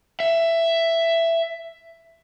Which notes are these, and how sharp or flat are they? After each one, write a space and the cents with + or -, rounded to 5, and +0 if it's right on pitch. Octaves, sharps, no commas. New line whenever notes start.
E5 +10